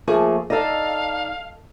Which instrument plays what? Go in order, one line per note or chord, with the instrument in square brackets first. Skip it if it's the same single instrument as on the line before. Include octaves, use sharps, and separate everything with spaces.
[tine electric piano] F3 A3 A#3 [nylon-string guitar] G#4
[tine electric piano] D#4 D5 [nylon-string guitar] A4 D#5 [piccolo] F5